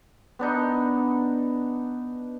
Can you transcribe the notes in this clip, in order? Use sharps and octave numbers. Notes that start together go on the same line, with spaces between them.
B3 D4 D#4